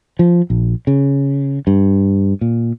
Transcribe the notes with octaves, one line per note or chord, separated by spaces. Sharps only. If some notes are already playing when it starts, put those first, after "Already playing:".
F3
A#1
C#3
G2
A#2